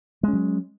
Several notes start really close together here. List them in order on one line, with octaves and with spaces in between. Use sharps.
G#3 C#4 F#3